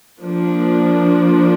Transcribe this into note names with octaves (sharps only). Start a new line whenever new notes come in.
F3 A#3 D4